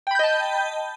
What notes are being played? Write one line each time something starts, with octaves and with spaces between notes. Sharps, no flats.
D#5 G5 A5 B5 G6